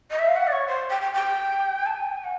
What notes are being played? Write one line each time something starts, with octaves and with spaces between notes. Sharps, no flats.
D#5
E5
F5
F#5
D5
C#5
C5
G5
G5
G5
A5
G#5
G5
G#5
F#5